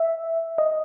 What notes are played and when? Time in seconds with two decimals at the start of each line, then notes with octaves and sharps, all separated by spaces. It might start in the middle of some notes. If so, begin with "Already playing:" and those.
Already playing: E5
0.58 D#5